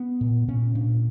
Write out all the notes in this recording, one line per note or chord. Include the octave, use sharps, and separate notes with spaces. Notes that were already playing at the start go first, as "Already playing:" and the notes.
Already playing: B3
A#2
A#2 C#4
A#2 D4